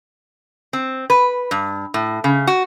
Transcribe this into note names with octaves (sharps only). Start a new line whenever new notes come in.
C4
B4
G2
A2
C#3
F#4